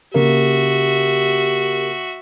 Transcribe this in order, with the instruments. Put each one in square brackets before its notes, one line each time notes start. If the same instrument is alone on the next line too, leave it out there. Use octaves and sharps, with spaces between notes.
[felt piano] C#3 A#3 [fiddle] F#4 E5 [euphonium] G4